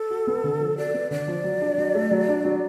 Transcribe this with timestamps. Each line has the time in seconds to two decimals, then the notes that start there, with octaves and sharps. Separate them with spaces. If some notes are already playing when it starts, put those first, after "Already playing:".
Already playing: A4
0.10 F#4
0.27 B3
0.44 D3
0.60 F3
0.78 F#4 D5
0.94 B3
1.11 D3 D5
1.28 F3
1.44 F#3
1.61 D4
1.78 F#3
1.95 A3
2.11 F#3
2.28 D4
2.45 F#3